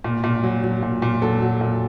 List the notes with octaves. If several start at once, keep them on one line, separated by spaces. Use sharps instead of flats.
A#2
A#2
F#3
F#3
A#2
A#2
F#3 A4
F#3
A#2